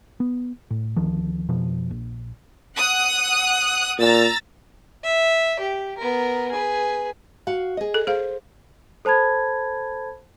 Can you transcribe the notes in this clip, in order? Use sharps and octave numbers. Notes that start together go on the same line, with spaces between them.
B3
A2
D2 D#3 F3
F2 B2 F3
A#1
F#5 D#6 F#6
A#2 A#5 E6 A6
E5
G4
B3 A#4
G#4 B4
F#4 F5 F#5
G#4 D#5
A4
G#4 C5 F5
A4 C5 A5 B5 G#6